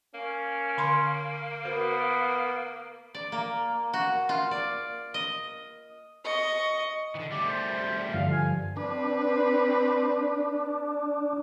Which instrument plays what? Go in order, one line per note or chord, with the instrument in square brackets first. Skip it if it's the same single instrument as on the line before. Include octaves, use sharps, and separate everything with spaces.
[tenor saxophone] A#3 [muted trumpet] C#4
[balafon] D3 B5 C6
[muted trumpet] B3 [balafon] F#4 A#4 C5
[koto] D5
A#3
F#4
F4
D5
D#5
[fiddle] D#5 C#6
[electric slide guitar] D3 E3
[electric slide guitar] G3 A3 [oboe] D6
[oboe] C5
[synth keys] G2 D3 F3 [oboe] F5
[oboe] G#5
[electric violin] C4 B4 [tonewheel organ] D4